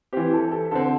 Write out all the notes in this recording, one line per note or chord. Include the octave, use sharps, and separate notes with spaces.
E3 C4 G4
A4
A4
D3 C4 A4